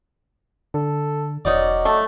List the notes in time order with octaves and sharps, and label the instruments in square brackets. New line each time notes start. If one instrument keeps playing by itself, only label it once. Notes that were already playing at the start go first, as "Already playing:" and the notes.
[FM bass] D3 [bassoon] A4
[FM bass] E1 [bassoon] F#3 [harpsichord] C#4 D#4 D5
[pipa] A3